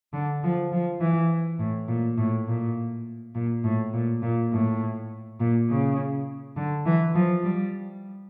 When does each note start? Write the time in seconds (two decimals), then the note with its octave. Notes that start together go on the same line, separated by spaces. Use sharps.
0.13 D3
0.43 F3
0.72 F3
1.01 E3
1.59 A2
1.88 A#2
2.18 A2
2.48 A#2
3.35 A#2
3.64 A2
3.94 A#2
4.22 A#2
4.52 A2
5.40 A#2
5.69 C#3
6.57 D3
6.86 E3
7.15 F3
7.44 G3